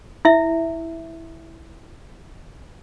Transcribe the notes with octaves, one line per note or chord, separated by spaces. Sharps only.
E4 E5